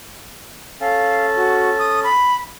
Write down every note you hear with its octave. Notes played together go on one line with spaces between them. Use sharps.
C#4 A4 F5
F#4
D#6
B5